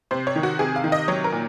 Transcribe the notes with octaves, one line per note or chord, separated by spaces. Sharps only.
C3 C5
C#5
D#3
F#4
C3 G#4
F5
D#3
D#5
F#3 C#5
A#4
A#2